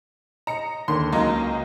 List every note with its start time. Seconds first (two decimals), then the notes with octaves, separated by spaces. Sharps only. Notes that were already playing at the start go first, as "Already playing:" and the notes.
0.47 D#5 A#5 C#7
0.88 D#2 D3 D#3 C6
1.12 C#2 F#3 A#3 D#4